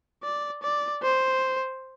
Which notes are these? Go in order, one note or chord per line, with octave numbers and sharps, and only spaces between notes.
D5
D5
C5